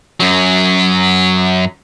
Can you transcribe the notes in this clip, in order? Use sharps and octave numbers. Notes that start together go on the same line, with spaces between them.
F#2 F#3